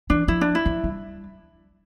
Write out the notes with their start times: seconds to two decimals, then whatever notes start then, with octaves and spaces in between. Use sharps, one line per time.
0.10 E3 D4
0.28 F3 E4
0.41 D4
0.55 E4
0.65 F3
0.84 G3